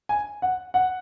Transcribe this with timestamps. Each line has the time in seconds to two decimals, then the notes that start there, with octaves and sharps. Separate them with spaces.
0.09 G#5
0.42 F#5
0.74 F#5